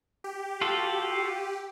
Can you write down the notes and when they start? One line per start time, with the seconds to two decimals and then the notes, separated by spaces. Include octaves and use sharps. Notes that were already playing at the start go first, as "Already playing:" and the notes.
0.24 G4
0.61 F4 F#4 A4